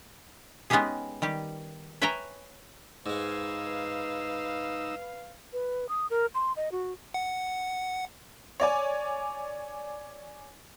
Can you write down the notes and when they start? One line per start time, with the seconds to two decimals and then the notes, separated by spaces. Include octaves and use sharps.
0.70 G#3 B3 C#4 D#4 G4 G#4
1.22 D#3 G3 G4
2.02 B4 C#5 E5 G5 G#5 A#5
3.06 G#2 G#3 D#4 B4 F5 E6
5.53 B4
5.89 D#6
6.10 A#4
6.35 C6
6.57 D#5
6.72 F#4
7.14 F#5
8.60 C#5 D5 G#5